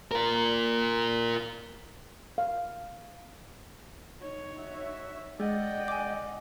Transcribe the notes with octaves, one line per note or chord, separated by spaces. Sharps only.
F4 A#4
F5
D#4 C#5
F#4 E5
G#3 D5 D#5 F#5 G5
G#5 D6